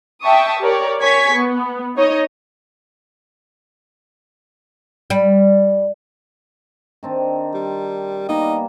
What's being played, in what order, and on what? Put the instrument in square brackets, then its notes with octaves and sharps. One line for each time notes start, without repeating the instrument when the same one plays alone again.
[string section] E5 G5 A5 C#6 D#6
G4 A#4 C#5 D5
C#5 G#5 C#6 G#6 B6
B3
D#4 C#5 D#5
[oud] G3
[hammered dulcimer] D#3 C4 D4
[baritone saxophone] G3
[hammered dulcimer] G3 A#3 B3 [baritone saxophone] D#4